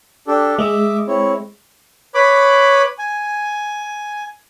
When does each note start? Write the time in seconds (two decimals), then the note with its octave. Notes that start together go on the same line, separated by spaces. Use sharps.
0.28 D4 G4 A4
0.59 G#3 D#5 E5 D6
1.07 C4 E4 C#5
2.14 B4 C#5 B5 D6
2.98 G#5